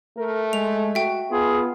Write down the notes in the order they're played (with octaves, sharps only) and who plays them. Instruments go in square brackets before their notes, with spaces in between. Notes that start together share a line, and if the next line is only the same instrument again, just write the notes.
[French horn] A3 [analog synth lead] A#4
[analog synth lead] G#3 [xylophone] F7
[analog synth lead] F#4 [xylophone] E5 G5
[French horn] B3 [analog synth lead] F4 [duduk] G#4